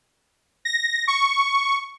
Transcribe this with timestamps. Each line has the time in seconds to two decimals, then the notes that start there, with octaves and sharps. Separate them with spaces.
0.65 A#6
1.08 C#6